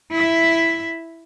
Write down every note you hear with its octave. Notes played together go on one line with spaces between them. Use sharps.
E4 E5